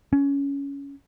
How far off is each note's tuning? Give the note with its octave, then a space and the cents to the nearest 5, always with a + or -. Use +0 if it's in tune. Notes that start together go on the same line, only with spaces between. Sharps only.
C#4 +15